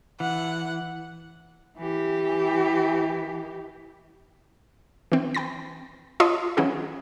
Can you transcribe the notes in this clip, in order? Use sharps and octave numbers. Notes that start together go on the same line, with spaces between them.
E3 F#5
E3 G4
E3 C4
G5 B5 A6 A#6
F4 C#5 D#5 A5 C6 D#6
E3 F#3 C#4 E4 F#4 G#4